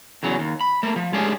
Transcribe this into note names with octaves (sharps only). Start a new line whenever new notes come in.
E2 C#3 F#3
D#2
B5
A3 A#3
F3
G#3 A3 C#4 D4 G4 G#4